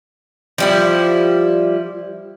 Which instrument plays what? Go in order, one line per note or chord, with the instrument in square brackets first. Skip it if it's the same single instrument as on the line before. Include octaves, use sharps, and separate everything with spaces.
[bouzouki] F3 G3 E4